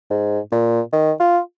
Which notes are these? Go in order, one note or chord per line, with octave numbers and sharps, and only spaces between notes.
G#2
A#2
D#3
F4